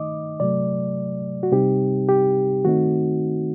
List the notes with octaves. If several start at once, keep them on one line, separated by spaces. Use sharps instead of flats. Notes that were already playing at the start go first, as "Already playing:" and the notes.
Already playing: D#3 A3 D#4 D#5 D6
C3 F#3 A3 D5
F#4
C3 G3 C4 D#4 G4
G4
D#3 A3 C4 D#4 F#4